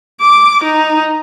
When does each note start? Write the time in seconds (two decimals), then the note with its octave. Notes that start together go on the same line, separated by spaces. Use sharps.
0.21 D6
0.63 D#4